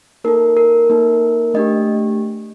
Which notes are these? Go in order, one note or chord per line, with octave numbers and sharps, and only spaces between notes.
A#3 D#4 A4 A#4
A#4
A#3 D#4 A4
A3 D4 G4 D#5